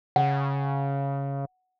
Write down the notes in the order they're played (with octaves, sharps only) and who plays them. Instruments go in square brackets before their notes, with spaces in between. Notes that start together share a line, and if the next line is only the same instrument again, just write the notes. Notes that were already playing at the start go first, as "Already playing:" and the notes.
[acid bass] C#3 [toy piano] F#5